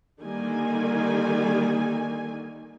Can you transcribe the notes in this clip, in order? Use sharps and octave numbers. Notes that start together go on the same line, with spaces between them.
D3 D#3 G3 A#3 G#5